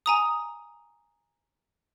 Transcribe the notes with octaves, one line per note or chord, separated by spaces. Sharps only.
G#5 A#5 D#6